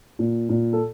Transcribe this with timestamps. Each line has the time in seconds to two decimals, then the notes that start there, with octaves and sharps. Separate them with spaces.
0.19 A#2
0.49 A#2
0.73 A4